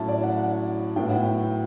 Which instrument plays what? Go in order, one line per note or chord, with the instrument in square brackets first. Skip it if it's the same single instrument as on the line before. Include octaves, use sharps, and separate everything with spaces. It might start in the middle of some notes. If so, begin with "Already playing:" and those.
Already playing: [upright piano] A2 F#3 C#4 E4 E5 A5
D5
F#5
F#5
A2 F#3 B3 E4 G5
F#5
G5